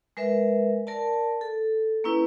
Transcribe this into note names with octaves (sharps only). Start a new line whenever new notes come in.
G#3 A#4 B4 E5
A#4 D5 A5
A4
A#3 C#4 E4 B4